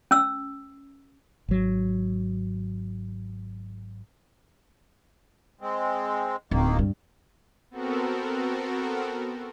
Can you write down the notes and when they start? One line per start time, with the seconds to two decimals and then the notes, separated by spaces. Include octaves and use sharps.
0.11 C#4 E6
1.48 G#1 F#3
5.61 G#3 C4
6.51 D1 D#3 A#3
6.79 G2
7.71 B3 C4 F#4 A4 A#4